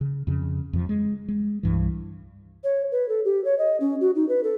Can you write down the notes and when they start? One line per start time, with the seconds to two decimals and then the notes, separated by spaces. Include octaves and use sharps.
0.01 C#3
0.27 F2 C#3
0.73 F2 F3
0.89 G#3
1.28 G#3
1.63 C2 G2 E3
2.63 C#5
2.92 B4
3.09 A4
3.25 G4
3.45 C#5
3.58 D#5
3.80 C#4
4.01 F#4
4.16 D#4
4.29 B4
4.44 A4